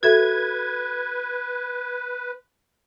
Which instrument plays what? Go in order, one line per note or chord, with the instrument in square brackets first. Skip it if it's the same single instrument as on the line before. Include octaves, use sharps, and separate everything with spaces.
[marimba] F#4 A4 E5 [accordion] B4 [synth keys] G#6